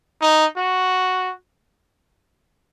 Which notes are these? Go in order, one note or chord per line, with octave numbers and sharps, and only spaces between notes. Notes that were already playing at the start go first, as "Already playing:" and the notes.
D#4
F#4